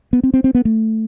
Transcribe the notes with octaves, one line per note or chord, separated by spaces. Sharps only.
B3
C4
C4
C4
B3
A3